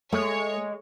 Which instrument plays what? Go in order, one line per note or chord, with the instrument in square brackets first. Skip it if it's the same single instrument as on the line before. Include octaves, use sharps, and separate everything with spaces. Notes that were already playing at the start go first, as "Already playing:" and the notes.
[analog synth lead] G#3 [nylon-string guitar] A3 [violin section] C#5